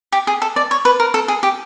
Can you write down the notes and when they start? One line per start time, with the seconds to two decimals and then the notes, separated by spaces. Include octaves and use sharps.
0.12 G4
0.27 G#4
0.42 A4
0.56 D5
0.71 C#5
0.85 B4
1.00 A#4
1.14 A4
1.28 G#4
1.43 G4